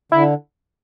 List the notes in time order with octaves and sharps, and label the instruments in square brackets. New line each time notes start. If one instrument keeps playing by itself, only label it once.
[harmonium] D3 [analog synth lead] E4